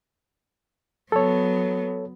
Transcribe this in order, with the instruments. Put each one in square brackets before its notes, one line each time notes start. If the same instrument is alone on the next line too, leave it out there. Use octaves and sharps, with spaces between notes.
[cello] F#3 B3 [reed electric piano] A4 C#5